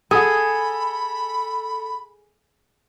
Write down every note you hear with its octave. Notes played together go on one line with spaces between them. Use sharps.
G#4 A4 F#5 G#5 B5